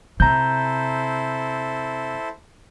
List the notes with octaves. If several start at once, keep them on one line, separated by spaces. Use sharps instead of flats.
C3 E4 A4 C5 A#5 G6